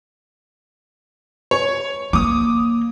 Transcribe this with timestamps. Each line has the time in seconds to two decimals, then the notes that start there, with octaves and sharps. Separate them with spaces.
1.51 C#5
2.13 A#3 D6 D#6